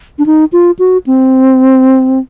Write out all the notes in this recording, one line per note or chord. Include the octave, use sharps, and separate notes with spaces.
D4
D#4
F4
F#4
C4